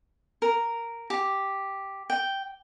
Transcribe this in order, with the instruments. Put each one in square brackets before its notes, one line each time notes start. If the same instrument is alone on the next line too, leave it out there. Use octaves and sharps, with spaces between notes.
[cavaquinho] A#4
G4
G5